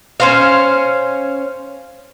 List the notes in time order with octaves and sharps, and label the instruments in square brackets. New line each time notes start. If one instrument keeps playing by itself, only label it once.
[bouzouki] C#4 C5 F5